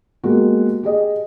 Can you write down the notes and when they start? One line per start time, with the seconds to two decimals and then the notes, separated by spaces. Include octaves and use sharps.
0.23 G#3 A#3 B3 F#4 G4
0.83 G4 G#4 D#5